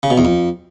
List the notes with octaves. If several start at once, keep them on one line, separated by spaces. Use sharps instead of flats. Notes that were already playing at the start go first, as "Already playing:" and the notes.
C#3
B2
E2
F2